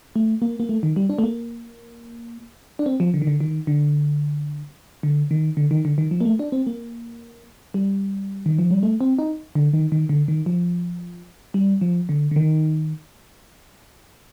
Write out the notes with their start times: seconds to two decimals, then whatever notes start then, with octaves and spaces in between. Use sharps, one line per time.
0.16 A3
0.42 A#3
0.60 A#3
0.69 A3
0.83 D#3
0.96 G3
1.09 D4
1.18 A3
1.24 A#3
2.79 D4
2.86 C4
3.00 F3
3.14 D3
3.22 D#3
3.27 D3
3.40 D#3
3.67 D3
5.03 D3
5.31 D#3
5.57 D3
5.71 D#3
5.85 D3
5.98 D#3
6.11 F3
6.21 A#3
6.25 A3
6.39 D4
6.52 C4
6.67 A#3
7.74 G3
8.46 D#3
8.58 F3
8.71 G3
8.83 A3
9.01 C4
9.19 D#4
9.55 D3
9.73 D#3
9.92 D#3
10.09 D3
10.28 D#3
10.46 F3
11.54 G3
11.81 F3
12.09 D3
12.31 D3
12.36 D#3